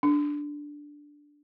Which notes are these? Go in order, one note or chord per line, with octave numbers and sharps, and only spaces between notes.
D4